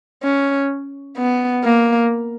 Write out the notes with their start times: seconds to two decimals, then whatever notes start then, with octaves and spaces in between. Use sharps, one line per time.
0.23 C#4
1.17 B3
1.64 A#3